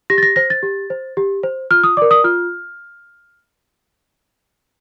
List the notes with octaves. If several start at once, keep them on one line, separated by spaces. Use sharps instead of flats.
G4 A#6
A6
A#6
C5 A#6
A6
G4
C5
G4
C5
F4 F6
D#6
A#4 D5 D6
D#6
F4 F6